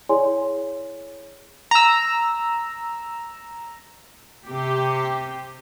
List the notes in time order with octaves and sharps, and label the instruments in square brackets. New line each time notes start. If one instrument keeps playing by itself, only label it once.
[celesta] E4 G#4 C#5 D5 G#5 C6
[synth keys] A#5 E6
[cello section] C3 G4